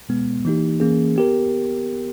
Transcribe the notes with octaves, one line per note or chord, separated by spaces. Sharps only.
B2 G#3 B3
E3 A#3 D#4 G4
E3 A#3 C#4 G#4
B3 G4 A#4